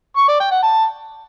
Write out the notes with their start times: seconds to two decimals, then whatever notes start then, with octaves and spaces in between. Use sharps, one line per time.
0.17 C#6
0.29 D5
0.40 G5
0.51 F#5
0.63 A5